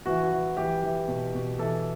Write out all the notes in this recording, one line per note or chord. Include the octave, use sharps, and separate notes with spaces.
E3 F#4
F#4
E3
E3 G4
E3
B2
B2
E3 A4